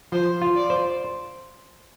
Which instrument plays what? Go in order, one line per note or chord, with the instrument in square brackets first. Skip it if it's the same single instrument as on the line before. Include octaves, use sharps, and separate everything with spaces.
[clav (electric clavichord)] F3 [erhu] C5
[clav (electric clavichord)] F4
[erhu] D5
[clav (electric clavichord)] C5